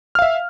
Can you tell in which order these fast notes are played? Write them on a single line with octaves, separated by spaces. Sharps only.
F6 F5 E5